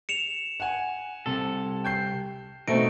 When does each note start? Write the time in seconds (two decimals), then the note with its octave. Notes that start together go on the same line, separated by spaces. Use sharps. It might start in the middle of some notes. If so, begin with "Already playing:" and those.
0.09 C#7 E7 F7
0.60 F#5 G#5
1.26 C2 C3 A4
1.84 G5 G6 C7
2.68 B2 A3 C4 D#4 D7